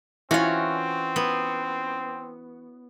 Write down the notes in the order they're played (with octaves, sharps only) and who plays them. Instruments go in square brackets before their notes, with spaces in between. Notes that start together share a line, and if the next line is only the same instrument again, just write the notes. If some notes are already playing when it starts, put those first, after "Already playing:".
[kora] E3 C#4 F4 [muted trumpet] C4 [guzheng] F#4 C#5
[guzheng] B3